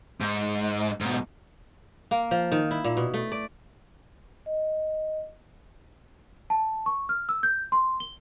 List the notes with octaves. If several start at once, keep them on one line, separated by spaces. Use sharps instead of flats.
G#2
G#2 B2
A#3
F3
D#3
E4
A#2
B2
A3
D5
D#5
A5
C#6
F6
E6
G6
C6
G7